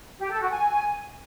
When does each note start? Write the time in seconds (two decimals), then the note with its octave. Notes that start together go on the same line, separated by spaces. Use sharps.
0.19 G4
0.30 A4
0.41 F#4
0.51 G#5